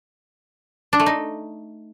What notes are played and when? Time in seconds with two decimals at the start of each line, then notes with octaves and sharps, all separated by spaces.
0.93 D4
1.00 A3
1.06 D#4